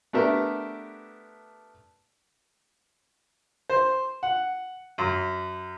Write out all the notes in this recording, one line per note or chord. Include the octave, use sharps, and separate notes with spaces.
A3 B3 D4 G4 A#4 E5
C5
F#5
F#2